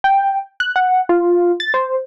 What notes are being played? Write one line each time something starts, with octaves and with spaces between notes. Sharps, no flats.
G5
F#6
F#5
F4
A6
C5